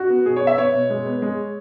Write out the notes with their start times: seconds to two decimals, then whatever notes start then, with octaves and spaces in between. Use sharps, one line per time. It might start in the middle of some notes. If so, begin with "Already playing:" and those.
Already playing: F#4
0.10 B3
0.26 B2 G#4
0.36 C#5
0.42 B3
0.47 E5
0.58 B3 C#5
0.74 B2
0.90 G#3
1.06 B3
1.22 G#3